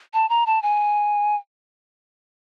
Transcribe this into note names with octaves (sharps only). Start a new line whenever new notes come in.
A5
A#5
A5
G#5